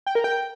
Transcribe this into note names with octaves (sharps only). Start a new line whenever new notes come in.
G5
A#4
G5